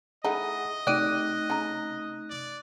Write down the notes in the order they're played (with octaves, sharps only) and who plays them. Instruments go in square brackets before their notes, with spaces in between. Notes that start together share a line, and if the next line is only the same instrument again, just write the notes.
[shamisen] A3 D#4 E4 [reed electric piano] G#4 F#5 [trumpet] D#5
[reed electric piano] C3 A3 D#4 [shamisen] F#4 G4 D5 [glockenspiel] F#6 D#7
[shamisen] C#3 A#5
[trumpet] D5